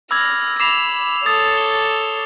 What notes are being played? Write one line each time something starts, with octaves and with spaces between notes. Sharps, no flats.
B5 D6 E6 F6 G#6 A#6
B5 D6 C7 E7 F7
A4 C#5 D#6 A6
G7